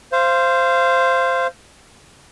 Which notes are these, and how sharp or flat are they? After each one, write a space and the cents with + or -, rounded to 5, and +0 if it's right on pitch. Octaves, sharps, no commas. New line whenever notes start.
C5 +0 F5 -25